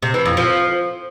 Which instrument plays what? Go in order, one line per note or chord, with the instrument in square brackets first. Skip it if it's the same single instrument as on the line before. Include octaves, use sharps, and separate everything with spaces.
[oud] C3
E3
F2
F3